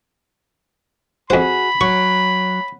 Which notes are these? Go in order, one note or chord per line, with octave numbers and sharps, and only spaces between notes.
F2 F#4 G#4 C5 B5
F#3 C#6